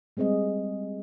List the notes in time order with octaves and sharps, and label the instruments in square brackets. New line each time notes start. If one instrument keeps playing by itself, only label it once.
[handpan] G3 G#3 C4 G#4 D#5